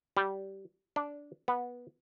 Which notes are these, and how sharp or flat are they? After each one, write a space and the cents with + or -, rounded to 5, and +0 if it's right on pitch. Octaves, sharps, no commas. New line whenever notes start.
G3 -15
D4 -10
B3 -10